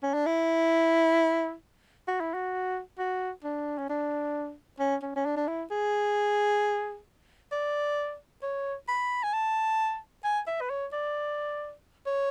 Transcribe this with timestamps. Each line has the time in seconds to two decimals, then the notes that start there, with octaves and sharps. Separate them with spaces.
0.03 C#4
0.14 D4
0.26 E4
2.08 F#4
2.21 E4
2.34 F#4
2.99 F#4
3.44 D4
3.78 C#4
3.89 D4
4.80 C#4
5.03 C#4
5.16 C#4
5.26 D4
5.37 D4
5.48 E4
5.71 G#4
7.52 D5
8.43 C#5
8.88 B5
9.24 G#5
9.34 A5
10.24 G#5
10.47 E5
10.61 B4
10.70 C#5
10.93 D5
12.06 C#5